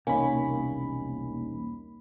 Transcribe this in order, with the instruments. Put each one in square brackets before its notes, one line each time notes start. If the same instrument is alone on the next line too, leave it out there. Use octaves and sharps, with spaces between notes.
[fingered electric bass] E1 C2 C3 [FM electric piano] A#3 B5 [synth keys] C#4 D#4 [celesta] G#5